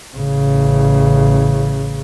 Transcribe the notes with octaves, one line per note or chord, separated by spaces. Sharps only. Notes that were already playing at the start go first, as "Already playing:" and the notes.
A1 C#3